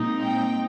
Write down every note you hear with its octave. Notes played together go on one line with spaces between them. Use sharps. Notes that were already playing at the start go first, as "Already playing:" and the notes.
Already playing: A#2 G#3 C4 D#4
G5